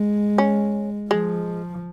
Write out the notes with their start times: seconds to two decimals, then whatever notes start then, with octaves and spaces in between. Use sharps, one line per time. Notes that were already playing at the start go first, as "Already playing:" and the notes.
Already playing: G#3
0.38 C#4
1.11 F3 G#3